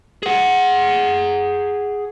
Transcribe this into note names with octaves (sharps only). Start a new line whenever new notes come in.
G#4 F#5